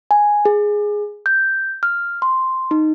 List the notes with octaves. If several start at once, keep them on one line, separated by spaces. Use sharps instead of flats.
G#5
G#4
G6
F6
C6
D#4